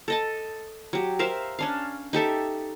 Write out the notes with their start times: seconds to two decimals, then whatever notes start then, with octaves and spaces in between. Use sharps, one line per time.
0.08 A4 D#5 A5
0.93 F#3 G4
1.19 A#4 C5 E5 F5
1.59 C#4 D4 F5
2.13 D#4 G4 A4 E5